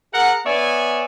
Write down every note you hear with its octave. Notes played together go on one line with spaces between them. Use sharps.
G#4 A#4 F#5
B3 C#5 D5 E5 G#5